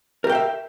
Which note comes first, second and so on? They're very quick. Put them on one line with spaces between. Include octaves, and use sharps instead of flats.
A#4 G4 G5 F5 E5